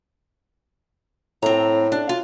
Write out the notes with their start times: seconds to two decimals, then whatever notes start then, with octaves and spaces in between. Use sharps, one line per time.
1.43 A2 C4 A#5
1.92 D4
2.09 F4